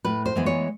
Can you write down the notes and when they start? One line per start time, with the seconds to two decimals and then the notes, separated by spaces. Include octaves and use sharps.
0.05 A2 B4
0.26 C5
0.36 E3 G#3 B3
0.46 C#5